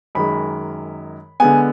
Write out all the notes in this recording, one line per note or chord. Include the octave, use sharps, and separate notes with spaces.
F#2 D#3 G#3 B5
D3 G#3 B3 G#5